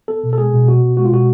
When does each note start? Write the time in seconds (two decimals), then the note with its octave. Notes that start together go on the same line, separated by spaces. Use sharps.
0.08 B3 A4
0.23 B2
0.33 A4
0.38 G#3 G#4
0.53 B2
0.68 B3 F#4
0.83 B2
0.97 G#3 F#4
1.05 F4
1.12 B2 F#4